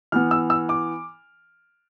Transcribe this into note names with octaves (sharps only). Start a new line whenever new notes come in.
E3 B3 F6
E6
E6
D6